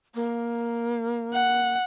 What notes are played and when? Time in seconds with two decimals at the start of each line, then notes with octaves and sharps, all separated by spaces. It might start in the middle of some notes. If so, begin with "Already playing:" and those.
0.15 A#3
1.33 F#5